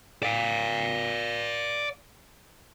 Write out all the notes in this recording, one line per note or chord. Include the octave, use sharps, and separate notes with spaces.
D5 F5